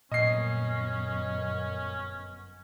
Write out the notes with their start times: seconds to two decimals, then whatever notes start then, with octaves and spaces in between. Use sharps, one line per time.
0.12 G1 F#2 A#2 B3 C#4 D#5 C7